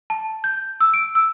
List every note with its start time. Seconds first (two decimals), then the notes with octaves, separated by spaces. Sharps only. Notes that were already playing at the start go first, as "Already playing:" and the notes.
0.10 A5
0.44 G6
0.80 E6
0.94 D7
1.15 E6